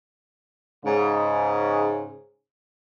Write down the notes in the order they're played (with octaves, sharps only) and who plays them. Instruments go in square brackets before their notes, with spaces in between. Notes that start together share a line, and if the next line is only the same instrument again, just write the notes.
[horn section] G#2 C#3